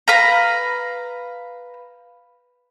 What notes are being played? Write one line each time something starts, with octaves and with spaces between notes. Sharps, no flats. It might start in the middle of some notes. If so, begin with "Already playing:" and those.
B4 F5 A#5